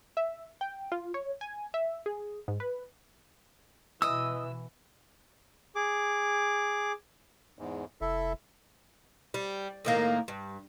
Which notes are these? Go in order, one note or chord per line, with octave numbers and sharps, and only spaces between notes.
E5
G5
F4
C#5
G#5
E5
G#4
G#2
B4
B2 E3 D#5 D#6 E6
G#4 D6
E2 G#2
F1 E4 A4 E5
G3
A2 D#3 A#3
G2